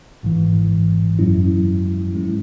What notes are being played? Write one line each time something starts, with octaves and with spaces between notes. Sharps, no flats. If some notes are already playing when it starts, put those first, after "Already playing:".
G#1 G#2 E3
F#2 F#3 C#4 E4
G#2 G#3 C#4 E4